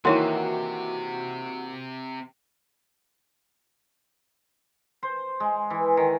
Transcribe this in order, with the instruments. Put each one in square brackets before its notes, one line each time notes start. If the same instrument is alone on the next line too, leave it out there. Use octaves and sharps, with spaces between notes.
[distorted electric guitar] C3 [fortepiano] D#3 E3 A#3 [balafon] E4 C#5 C6 [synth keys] F#4
[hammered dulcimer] C5
G#3
E3
D#3